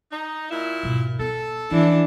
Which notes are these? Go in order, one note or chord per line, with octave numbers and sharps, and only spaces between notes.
D#4
A#2 E4
G#2 B2
B3 A4
E3 F3 D4